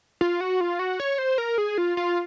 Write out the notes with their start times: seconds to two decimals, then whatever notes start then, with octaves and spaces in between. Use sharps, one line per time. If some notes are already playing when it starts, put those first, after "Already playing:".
0.21 F4
0.41 F#4
0.61 F4
0.79 F#4
1.00 C#5
1.18 C5
1.38 A#4
1.58 G#4
1.78 F4
1.97 F4